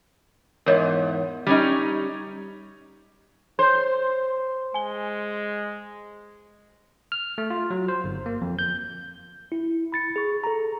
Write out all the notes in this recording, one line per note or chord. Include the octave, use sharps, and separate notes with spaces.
E2 G#2 A#4 C#5 D#5
G3 C#4 D#4
C5 C#5 G6
G#3 G#5 G7
F6
A3
F4
F#3
C5
G1
A#3
F2
G6
E4
B5 A6 C#7
G#4 C#6
A4 A#5